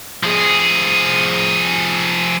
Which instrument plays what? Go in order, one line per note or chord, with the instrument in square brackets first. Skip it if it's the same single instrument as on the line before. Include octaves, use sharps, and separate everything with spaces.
[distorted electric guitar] F3 G#4